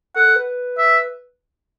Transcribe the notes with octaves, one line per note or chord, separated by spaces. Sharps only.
A4 F#5
A4
B4
E5